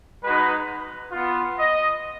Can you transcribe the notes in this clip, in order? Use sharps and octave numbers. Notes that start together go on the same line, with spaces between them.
G#3 D#4 F#4 B4
B3 F4
D#5